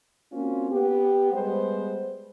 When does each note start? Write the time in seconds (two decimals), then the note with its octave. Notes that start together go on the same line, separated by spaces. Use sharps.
0.32 A#3 C4 C#4 F4 F#4
0.71 B3 G4
1.32 G3 G#3 B3 C5